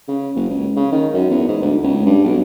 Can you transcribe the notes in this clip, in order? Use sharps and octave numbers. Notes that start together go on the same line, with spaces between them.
C#3
F#1
C#2
C#3
D#3
F#2
E2
G#2
D2
C#2
G2
B1